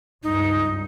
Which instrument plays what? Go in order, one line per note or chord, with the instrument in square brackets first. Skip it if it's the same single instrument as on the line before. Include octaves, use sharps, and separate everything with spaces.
[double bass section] C#2 G2 [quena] D#4